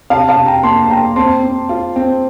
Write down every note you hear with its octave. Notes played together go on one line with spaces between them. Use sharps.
C3 F5 A5
F5 A5
C3
G5 A#5
A#3 A5 C6
A5
A#3 G5 A#5
C4 A5 C6
C4
F4
C4